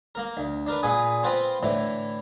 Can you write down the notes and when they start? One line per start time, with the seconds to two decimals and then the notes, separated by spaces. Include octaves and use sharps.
0.15 A#3 A#4
0.37 D2
0.66 D4 A#4 B4
0.83 A#2 G#4 B4 G#5 D#6
1.23 C4 F4 B4 C5 G5 B5
1.63 A2 D3 E3